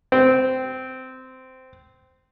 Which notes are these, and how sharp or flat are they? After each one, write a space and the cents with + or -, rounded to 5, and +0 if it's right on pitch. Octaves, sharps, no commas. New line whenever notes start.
C4 -15